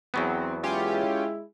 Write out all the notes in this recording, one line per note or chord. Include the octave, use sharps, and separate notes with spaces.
E2 F#3 B3 C4
G#3 C#4 E4 F4 G4